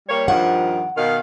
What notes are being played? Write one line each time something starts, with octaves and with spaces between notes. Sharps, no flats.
G3 A#3 C#5
G2 D#3 F3 F#5
B2 D#3 F5